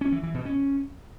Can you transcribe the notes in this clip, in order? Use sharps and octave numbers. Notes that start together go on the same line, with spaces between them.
C#4
E3
E3
B2
C#4